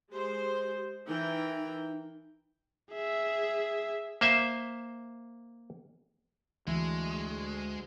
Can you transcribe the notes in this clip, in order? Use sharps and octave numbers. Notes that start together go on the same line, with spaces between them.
G#3 G4 C5
E3 D#4 A#4 G5
G#4 E5
A#3 C5 E5
D2 E3 G#3